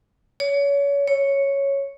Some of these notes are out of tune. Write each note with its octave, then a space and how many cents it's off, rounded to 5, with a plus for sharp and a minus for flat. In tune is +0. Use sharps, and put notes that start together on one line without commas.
C#5 +30
C#5 +0